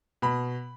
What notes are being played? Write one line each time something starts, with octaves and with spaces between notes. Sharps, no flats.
B2 B5